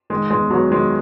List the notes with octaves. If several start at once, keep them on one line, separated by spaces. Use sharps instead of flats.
D#3 G#3
E2 G#3
E2 F#3
D#3 G#3